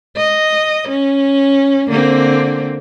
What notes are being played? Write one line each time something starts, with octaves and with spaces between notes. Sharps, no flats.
D#5
C#4
D3 A#3 C4